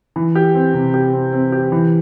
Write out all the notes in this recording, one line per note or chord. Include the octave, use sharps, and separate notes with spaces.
E3
G4
C4
C3
G4
C4
C4
G4
E3